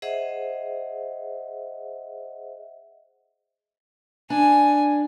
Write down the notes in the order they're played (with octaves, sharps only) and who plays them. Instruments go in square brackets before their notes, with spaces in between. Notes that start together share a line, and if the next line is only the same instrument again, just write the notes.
[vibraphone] G#4 C5 D#5 E5 F#5
[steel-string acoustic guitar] D4 [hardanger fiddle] G#5